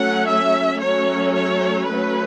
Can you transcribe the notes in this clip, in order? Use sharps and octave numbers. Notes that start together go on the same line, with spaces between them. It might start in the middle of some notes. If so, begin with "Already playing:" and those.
Already playing: F#3 A3 C#4 F#5
E5
F#3 A3 C#4 C#5
C#5
F#3 A3 C#4 B4